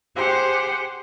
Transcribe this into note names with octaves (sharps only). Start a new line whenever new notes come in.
G4 G#4 C5 F#5 G5